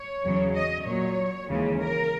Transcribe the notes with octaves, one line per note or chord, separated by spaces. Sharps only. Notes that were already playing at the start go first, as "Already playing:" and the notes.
Already playing: C#5
E2 C#3 F#3
D#5
A#2 F#3 C#5
D#2 C#3 E3 G#3
A#4